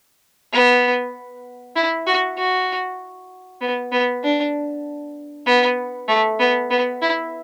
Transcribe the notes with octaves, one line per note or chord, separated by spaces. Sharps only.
B3
E4
F#4
F#4
B3
B3
D4
B3
A3
B3
B3
E4